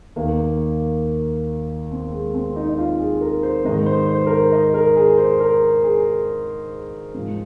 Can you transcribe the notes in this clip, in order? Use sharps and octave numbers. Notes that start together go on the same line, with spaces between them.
D#2 D#3 A#3
C4
G#3
C4
D#4
D#4
F4
G#4
A#4
C5
G#2 D#3 D#5
C5
C5
A#4
C5
D#5
A#4
G#4
C5
A#4
G#4
G#2 F3